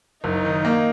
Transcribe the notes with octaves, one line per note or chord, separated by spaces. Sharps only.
F#1 D#4
D#3
A#3